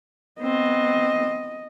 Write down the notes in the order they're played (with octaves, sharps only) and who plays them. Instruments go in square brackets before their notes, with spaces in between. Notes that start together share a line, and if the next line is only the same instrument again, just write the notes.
[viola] B3 C4 [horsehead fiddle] D#5